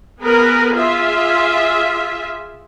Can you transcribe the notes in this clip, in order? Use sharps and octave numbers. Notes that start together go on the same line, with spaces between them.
B3 G#4 A#4 B4
F4 G#4 E5